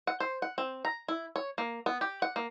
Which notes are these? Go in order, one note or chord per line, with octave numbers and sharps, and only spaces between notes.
F#5
C5
F#5
C4
A#5
E4
C#5
A#3
B3
G4
F#5
A#3